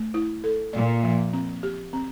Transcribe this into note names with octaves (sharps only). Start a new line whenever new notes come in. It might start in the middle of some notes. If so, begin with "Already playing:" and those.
Already playing: A3
E4
A4
A#2 D5
F3
C4
G4
C4